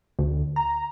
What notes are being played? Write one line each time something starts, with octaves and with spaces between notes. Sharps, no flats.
D2
A#5